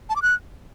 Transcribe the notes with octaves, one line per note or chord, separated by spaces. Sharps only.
A5
D6
F#6